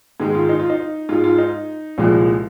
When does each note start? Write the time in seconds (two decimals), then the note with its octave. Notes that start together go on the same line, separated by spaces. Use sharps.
0.20 G#2 D#3 G#3
0.35 F4
0.49 D#4
0.60 F4
0.70 D#4
1.09 G#2 G#3 F4
1.24 F4
1.38 D#4
1.98 C2 A#2 F3 G#3